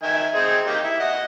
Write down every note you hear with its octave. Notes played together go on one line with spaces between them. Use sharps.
D#3 E5 G#5
C4 D#4 G#4
A#3 D#4 G4
E4
D#5 F#5